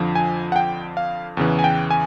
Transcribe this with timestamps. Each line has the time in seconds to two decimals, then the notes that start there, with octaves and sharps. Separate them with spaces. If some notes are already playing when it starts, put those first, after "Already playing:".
Already playing: F2 D3 F3
0.15 G#5
0.52 F#5
0.56 G5
0.97 F5
1.37 E2 C#3 E3
1.59 G#5
1.64 G5
1.91 G#5